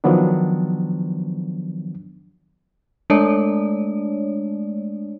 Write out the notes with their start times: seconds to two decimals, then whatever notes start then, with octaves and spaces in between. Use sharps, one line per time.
0.04 D#3 F3 F#3 B3 D4
3.10 G#3 A3 D4 C#5 D5